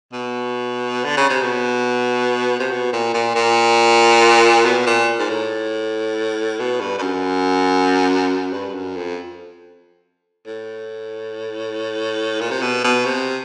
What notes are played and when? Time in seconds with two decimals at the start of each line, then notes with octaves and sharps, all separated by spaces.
0.13 B2
1.04 D3
1.17 C#3
1.29 C3
1.42 B2
2.60 C3
2.71 B2
2.93 A#2
3.14 A#2
3.35 A#2
4.65 B2
4.87 A#2
5.19 G#2
5.29 A2
6.59 B2
6.80 G2
6.98 G2
7.02 F#2
8.53 G2
8.74 F#2
8.96 F2
10.46 A2
12.41 A#2
12.51 C3
12.62 B2
12.84 B2
13.05 C3